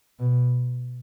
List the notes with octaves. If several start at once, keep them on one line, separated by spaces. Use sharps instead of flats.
B2